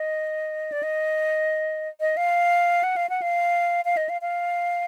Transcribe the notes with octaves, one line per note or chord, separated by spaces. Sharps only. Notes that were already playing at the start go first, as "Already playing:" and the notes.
Already playing: D#5
D5
D#5
D#5
F5
F#5
F5
F#5
F5
F5
D#5
F5
F5